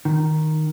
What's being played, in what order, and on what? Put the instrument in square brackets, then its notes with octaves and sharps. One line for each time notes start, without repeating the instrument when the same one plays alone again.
[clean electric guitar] D#3